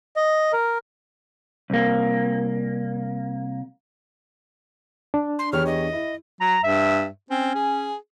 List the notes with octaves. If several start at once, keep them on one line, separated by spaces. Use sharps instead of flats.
D#5
A#4
C2 A#3
D4
C6
E2 G4 C#5 F6
D#5
E4
F#3 A#5
G2 E5
C4 C#4
G#4